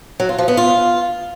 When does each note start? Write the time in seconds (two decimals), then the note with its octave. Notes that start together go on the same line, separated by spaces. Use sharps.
0.20 F#3
0.29 F4
0.38 F3
0.48 B3
0.57 F4